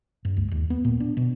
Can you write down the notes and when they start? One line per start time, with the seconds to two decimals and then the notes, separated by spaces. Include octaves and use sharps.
0.25 G2
0.37 C#2
0.52 D#2
0.70 B3
0.85 A#2
1.00 D4
1.17 B2